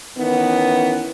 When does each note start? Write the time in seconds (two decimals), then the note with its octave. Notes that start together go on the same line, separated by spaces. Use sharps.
0.18 D#3 E3 B3 C#4 E4